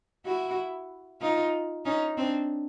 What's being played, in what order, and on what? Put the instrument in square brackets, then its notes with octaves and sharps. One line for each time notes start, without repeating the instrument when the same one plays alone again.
[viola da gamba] E4 F#4
D#4 F4
C#4 D#4
C4 D4